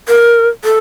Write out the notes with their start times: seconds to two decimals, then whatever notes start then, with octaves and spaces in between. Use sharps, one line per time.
0.08 A#4
0.65 A4